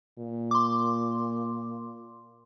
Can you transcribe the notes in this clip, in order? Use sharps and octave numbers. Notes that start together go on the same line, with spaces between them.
A#2
C6 D6